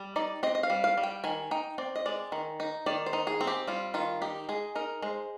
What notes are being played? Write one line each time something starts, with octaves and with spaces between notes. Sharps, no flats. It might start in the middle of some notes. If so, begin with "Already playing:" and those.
Already playing: G3
D#4 D5
C4 D#5
D#5
F5
G3
F5
G3
G5
D#3 G#5
D#4 G5
C4 D5
D#5
G#3 D5
D#3
D#4
D#3 D5
C5
D#4
G#4
C4
G4
G3 F4
D#3 F4
D#4 G4
G#3 G#4
D#4 A#4
G#3 C5